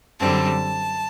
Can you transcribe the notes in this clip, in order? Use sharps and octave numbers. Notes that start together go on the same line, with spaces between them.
F#2 D3 G3 C4 A5